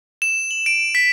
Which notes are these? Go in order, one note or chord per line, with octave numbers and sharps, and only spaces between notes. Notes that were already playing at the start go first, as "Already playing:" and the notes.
E7
F#7
D7
B6